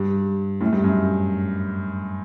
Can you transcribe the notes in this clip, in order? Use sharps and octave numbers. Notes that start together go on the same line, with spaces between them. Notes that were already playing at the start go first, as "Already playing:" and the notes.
Already playing: G2
F#2 A2
G2
F#2